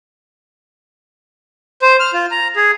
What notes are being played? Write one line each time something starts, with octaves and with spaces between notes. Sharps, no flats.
C5
F6
F4
A#5
G#4